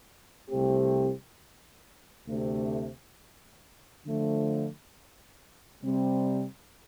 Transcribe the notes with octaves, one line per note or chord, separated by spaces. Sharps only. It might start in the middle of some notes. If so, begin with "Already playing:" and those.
C2 C3 A3 C4 G4
D2 C3 A3
D3 F3 A3
C3 G3 C4